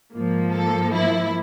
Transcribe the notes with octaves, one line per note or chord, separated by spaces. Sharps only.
G#2 F3 A#3
A4
E4